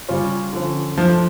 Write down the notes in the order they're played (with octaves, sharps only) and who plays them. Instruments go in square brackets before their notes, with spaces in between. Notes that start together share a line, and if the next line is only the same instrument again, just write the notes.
[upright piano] C#3 G3 C#4 F4 C#5
D3 F3 C#4
[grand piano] F3 [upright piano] A3 D4 F4